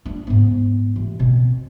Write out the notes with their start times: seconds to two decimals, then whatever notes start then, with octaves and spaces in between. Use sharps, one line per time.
0.05 D4
0.27 G#2 B3
0.96 A1
1.19 B2 C4